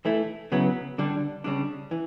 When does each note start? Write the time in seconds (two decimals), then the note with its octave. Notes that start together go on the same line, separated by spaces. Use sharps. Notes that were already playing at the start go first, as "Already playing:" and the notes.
0.05 E3 A3 E4
0.52 C#3 F#3 B3 E4
0.98 D3 G3 D4
1.44 C#3 G3 D4
1.91 E3